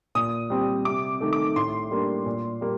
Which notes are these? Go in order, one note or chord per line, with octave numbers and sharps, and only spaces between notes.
A#2 D#6
G3 C4
C3 D6
D#3 A3
D6
A2 C6
G3 A#3 D4
A#2
G3 A#3